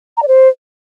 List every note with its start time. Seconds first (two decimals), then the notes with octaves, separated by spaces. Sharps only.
0.17 A#5
0.22 D5
0.28 C5